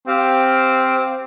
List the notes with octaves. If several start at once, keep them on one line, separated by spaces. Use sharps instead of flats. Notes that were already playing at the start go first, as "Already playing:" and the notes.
C4 G4 F5